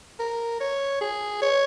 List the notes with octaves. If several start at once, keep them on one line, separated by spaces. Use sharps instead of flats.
A#4
C#5
G#4
C#5